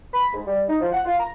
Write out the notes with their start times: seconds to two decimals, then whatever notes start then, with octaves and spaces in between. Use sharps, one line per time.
0.13 B5
0.33 G#2
0.46 G3
0.68 D#4
0.81 F3
0.92 F#5
1.05 F4
1.20 A#5